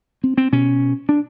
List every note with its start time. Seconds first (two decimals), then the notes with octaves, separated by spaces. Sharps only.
0.24 C4
0.38 C4
0.52 B2 C#4
1.09 D4